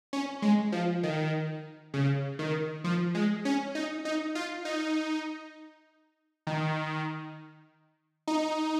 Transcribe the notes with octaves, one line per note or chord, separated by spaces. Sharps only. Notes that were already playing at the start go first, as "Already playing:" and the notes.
C#4
G#3
F3
D#3
C#3
D#3
F3
G#3
C#4
D#4
D#4
F4
D#4
D#3
D#4